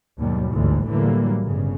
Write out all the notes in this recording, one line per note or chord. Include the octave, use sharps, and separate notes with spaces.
D#2 G#2 B2 F#3 G3
G1 D2 G#2 E3
A2 D3 E3 F#3 G3 A#3
G1 C#3